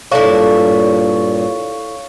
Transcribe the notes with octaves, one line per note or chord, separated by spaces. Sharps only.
G2 A#2 E4 A4 C#5 D5 F5 C#6